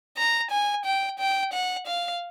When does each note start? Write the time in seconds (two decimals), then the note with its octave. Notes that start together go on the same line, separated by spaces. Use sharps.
0.17 A#5
0.51 G#5
0.85 G5
1.19 G5
1.53 F#5
1.87 F5